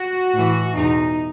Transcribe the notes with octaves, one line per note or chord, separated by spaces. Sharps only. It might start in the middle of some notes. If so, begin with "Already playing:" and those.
Already playing: F#4
A2 E3
E2 B2 D#4